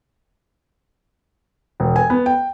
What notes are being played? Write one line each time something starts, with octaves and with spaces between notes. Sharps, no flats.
E1
G#5
B3
G5